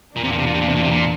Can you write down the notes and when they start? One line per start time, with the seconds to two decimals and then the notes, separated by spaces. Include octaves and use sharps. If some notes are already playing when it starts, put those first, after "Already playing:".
0.17 E2 A#2 E3 A#3 D4
0.24 C3
0.32 A#2
0.38 C3
0.46 A#2
0.54 C3
0.61 A#2
0.68 C3
0.75 A#2
0.83 C3
0.91 A#2